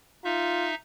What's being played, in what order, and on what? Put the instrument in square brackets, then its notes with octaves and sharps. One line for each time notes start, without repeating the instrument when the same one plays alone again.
[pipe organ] D#4 E5 [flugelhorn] F4